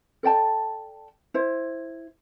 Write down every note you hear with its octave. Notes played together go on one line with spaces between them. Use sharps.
A4 D5 G5 A5
E4 C5